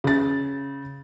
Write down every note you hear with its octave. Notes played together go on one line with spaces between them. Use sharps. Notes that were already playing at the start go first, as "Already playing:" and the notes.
C#3 A6